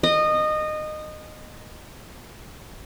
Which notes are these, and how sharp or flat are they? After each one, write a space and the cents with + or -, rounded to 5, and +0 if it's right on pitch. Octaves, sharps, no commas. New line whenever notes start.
D#5 -20